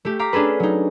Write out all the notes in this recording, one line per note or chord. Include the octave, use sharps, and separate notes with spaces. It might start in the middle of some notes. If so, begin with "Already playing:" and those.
A3 G4
F5 A#5 D6 B6
C#4 D4 G#4 A4 B4
F#3 D#4